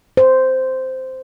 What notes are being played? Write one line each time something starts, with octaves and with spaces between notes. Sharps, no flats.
C5